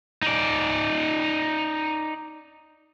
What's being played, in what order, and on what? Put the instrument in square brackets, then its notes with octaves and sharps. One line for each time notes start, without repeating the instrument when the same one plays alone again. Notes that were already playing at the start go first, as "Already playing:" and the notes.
[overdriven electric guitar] D#4 D5